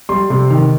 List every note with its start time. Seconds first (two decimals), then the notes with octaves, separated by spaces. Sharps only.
0.09 G3 C6
0.30 C3
0.50 D#3